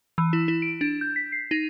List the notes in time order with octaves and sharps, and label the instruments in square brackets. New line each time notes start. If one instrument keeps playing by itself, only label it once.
[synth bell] E3
E4
E4
D7
D4
G6
B6
C7
D#4